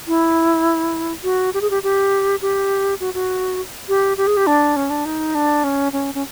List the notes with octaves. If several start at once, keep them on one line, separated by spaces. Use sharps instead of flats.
E4
F#4
G4
G#4
G4
G4
G4
F#4
F#4
G4
G4
G#4
G4
D4
C#4
D4
D#4
D4
C#4
C#4
C#4